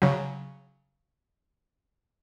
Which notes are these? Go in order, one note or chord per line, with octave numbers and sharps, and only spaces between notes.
C#3 F#3